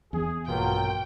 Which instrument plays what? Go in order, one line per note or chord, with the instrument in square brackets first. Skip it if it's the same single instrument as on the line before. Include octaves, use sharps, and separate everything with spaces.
[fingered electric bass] E2 [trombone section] G#4
[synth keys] A#1 G2 B2 [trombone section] F#3 A#3 F4 [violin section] G5